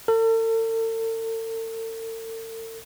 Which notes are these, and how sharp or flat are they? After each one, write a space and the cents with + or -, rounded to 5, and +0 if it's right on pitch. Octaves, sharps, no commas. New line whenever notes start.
A4 +45